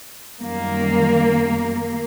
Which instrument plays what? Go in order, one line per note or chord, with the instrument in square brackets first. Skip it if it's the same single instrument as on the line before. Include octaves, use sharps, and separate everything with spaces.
[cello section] F#2 D#3 G3 A#3